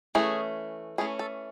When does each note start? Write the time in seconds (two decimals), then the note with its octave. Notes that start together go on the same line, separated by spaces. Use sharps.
0.15 E3 A3 C#4 G#4
0.98 E3 A3 C#4 G#4
1.19 A4